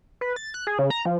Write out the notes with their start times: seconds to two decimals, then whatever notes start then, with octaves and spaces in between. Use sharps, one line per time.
0.21 B4
0.36 A6
0.54 F#6
0.67 G#4
0.79 C#3
0.90 A#5
1.05 F3